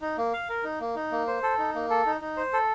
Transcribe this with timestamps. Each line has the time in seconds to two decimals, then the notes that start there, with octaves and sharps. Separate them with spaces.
0.01 D#4
0.18 A#3
0.33 F5
0.49 A#4
0.64 D#4
0.80 A#3
0.95 D#4
1.12 A#3
1.27 C5
1.43 A4
1.58 D#4
1.75 A#3
1.90 A4
2.06 D#4
2.21 D#4
2.37 C5
2.53 A4